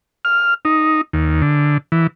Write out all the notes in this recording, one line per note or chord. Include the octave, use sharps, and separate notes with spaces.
F6
D#4
D#2
D3
E3